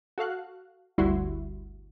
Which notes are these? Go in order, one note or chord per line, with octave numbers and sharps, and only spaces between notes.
F#4 A4 F5 F#6
G1 D2 G3 E4 F#4 C6